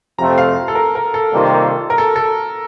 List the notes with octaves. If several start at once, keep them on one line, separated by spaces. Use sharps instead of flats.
F2 C3 F3 A3 C4 A#5
F5
A4
A#4
A#4
A4
C3 D#3 G3 A#3 F4
A#4
A4
A4